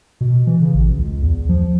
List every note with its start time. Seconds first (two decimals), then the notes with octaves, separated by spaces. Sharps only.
0.21 B2
0.47 E3
0.62 C#3
0.74 A1
0.99 C#2
1.22 E2
1.49 F3